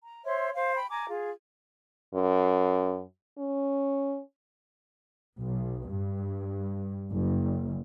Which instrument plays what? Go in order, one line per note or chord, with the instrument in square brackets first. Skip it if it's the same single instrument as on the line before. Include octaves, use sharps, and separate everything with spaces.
[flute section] A#5
C5 C#5 E5 C6
C5 F5
G5 B5
G#5 A#5 D6
F4 G#4
[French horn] F#2
C#4
[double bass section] B1
G2
F#1